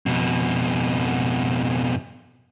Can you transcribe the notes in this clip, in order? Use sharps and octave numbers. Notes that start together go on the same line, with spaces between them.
F2 B2